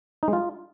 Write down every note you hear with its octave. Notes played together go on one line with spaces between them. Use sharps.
D#4
G#3
F4